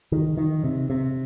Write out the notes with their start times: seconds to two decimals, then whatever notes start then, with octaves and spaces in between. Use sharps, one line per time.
0.12 D#3
0.37 D#3
0.64 C3
0.90 C3